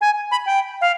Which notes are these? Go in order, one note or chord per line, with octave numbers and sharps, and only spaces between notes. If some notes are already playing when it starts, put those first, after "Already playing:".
G#5
B5
G5
F5